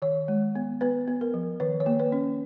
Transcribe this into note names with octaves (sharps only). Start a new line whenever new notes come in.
D#3 C#5
G#3
B3
B3 B4
B3
A#4
F3
D#3 B4
C#5
A#3
B4
C#4